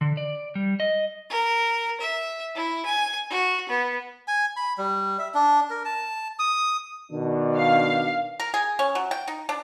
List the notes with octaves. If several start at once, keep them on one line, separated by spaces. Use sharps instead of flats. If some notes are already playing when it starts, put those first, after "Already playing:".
D3
D5
G3
D#5
A#4
E5
E4
G#5
F#4
B3
G#5
B5
G3
E5
D4
A#4
A5
D#6
B2 D#3 D4
F5
A#4
G#4
C#4
F#3
G5
D#4
D4